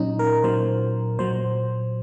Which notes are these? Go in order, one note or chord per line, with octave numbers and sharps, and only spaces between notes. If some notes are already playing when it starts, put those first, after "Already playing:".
Already playing: A#2 F#3 C#4 D#4
A#4
A#2 F#3 C5
A#2 F#3 C5